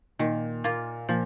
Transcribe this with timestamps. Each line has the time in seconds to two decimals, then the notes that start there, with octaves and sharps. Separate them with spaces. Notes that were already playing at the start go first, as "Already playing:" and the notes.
0.19 A#2 D#3
0.64 A#3 F4
1.09 A#2 F3